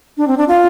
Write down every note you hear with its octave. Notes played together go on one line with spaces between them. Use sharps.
D4
C4
D4
F4